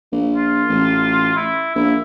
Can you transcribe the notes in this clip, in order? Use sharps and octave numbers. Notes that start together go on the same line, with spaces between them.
A#1
F4
A1
E4
A#1 E4